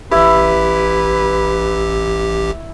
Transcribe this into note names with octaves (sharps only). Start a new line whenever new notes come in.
A1 E4 G4 B4